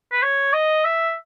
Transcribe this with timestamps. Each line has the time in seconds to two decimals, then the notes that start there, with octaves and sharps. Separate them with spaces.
0.12 B4
0.23 C#5
0.53 D#5
0.85 E5